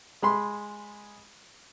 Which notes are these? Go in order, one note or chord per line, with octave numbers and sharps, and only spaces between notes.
G#3 B5 C6